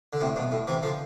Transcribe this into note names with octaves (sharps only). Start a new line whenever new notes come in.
D3
A2 C3
G2 B2
A2
C3 E3
D3 F3